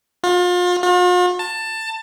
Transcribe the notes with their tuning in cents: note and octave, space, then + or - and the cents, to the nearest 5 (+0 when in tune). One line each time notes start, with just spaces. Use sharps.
F4 +35
F4 +45
A5 +15